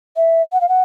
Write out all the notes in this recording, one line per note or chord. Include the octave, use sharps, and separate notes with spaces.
E5
F#5
F5
F#5